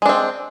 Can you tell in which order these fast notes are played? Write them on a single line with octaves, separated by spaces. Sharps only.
G#3 D4 C4